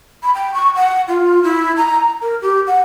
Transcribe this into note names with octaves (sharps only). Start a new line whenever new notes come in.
B5
G5
C#6
F#5
F4
E4
A#5
A#4
G4
F#5